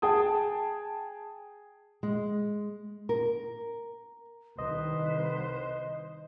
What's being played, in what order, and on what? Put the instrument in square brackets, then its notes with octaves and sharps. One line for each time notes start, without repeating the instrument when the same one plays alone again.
[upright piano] G#4 G5 A5 D#6
[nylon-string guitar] G#3
A#4
[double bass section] C2 D#3 [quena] B4 [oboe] C5 [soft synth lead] D#5